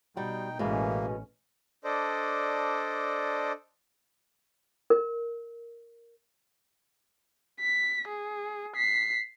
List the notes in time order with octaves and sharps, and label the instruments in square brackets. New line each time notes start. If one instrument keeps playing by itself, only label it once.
[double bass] B2 [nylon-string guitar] G3 F#4 [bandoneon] D#4 G5
[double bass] A1 C#4 [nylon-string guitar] B2 G#3 [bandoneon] E3 A#3
[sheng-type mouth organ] D4 A4 C5 D5 D#5
[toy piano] A#4
[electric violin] B6
G#4
B6 C7